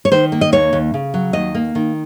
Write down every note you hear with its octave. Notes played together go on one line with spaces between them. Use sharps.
C#5
D#3 C5
A#3
D#5
D#2 C#5
D#2
C#3
F#3
D#2 D#5
A#3
D#3